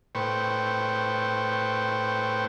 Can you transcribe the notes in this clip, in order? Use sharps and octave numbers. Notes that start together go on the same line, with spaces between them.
A2 B4 C5 G5 C#6